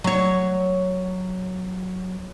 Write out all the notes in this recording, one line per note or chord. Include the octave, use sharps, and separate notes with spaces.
F#3 C#5